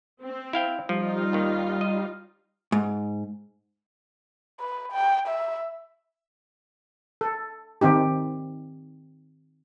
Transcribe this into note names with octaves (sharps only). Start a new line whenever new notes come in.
C4
E4 F5 G5
F3 G3 D#4 F4
D#2 D#3
D#5
G#2
B4
G5
E5
A4
D#3 C4 D#4 G4